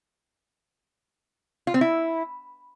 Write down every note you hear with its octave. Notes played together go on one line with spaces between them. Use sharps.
F4
C4
E4